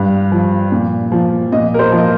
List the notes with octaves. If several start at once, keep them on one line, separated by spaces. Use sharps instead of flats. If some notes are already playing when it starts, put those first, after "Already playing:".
Already playing: G2 F5
F3
A#2
F3
A#2 D#5
A#4
C5
F3
D#5